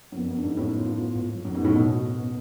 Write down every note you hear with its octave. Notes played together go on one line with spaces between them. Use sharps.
F#2
F2 B3
F#2
D4
G#2
A2 B3
F4
B3
G#2
F#3
F#2
G#2 B3
A2
B2 C#4
F#4
B3